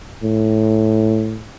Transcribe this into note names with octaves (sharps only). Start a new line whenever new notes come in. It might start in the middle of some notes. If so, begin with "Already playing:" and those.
A2